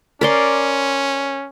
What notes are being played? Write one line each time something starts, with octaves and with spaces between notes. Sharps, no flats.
C#4 A#4 D5 C6